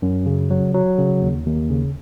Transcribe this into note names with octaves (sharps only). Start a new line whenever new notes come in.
F#2
C#3
F#3
F#3
C#3
D#2
D#2
C#3